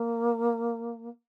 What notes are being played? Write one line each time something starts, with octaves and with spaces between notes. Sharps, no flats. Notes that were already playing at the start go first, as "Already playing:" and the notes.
Already playing: A#3